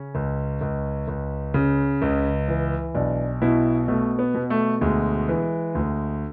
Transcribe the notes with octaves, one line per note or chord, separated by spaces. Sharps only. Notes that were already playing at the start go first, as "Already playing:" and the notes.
Already playing: C#3 C#4
C#2
C#2
C#2
C#3
C#2
E3
B1 D4
B2 E4
B2 A3
B3
B2
A3
D2 G#3
E3
D2